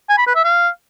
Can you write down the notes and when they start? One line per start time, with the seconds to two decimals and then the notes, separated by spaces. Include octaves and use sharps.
0.09 G#5
0.18 B5
0.27 B4
0.35 E5
0.44 F5